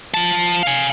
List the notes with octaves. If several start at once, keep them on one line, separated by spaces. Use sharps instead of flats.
F3 A5
F5 G#5